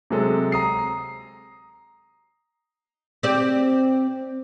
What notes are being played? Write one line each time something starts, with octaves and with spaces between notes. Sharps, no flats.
C3 F#3 G#3 A4
A#5 D#6 C7
C4 G4 D5